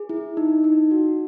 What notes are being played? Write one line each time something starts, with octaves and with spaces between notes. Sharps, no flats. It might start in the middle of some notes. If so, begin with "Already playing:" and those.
Already playing: G#4
E4
D#4
D#4
F#4